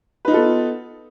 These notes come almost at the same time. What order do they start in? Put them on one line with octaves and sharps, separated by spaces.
B4 D#4 F4 A4 B3